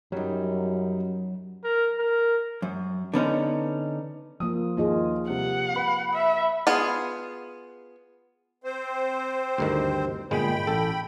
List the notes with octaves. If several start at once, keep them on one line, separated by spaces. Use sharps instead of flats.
F#2 F#3 G3 D#4
A#4
A#4
F#2
D3 B3 C#4 D#4
F3 A#3 F4 D#6
D#2 A#3 F4 G#4 D#5
C3 G3 F#5
B4 B5
E5
B3 F4 G#4
C4 C5
D2 G2 D#3
G1 A#2 G#3 G5 B5
A1 A4